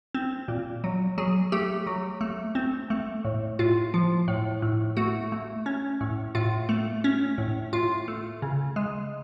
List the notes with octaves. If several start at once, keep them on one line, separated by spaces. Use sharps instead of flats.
C4
A#2
F#3
F#3 G#4
A3 G4
F#3
A3
C4
A3
A2
A2 F4
F3
A2
A2
A3 F#4
A3
C#4
A2
A2 F4
A3
C#4
A2
A2 F4
A3
C#3
G#3